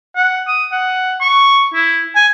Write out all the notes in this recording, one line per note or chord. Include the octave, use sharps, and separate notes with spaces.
F#5
D#6
F#5
C#6
E4
G#5